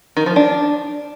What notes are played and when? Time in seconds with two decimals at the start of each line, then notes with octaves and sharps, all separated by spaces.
0.17 D#3
0.26 F3
0.36 D4